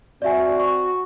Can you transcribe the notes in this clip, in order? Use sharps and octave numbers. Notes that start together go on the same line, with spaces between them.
C4 F#4 D5 E5 G#5
C#6